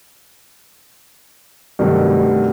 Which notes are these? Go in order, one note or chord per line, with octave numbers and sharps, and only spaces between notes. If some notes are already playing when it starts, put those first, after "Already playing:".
G2 C3 D#3 F#3 A3